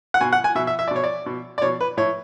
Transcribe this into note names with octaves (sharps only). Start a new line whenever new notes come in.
F#5
B2 G#5
F#5
G#5
B2 E5
E5
E5
D5
B2 C#5
D5
B2
D5
B2 C#5
B4
A2 C#5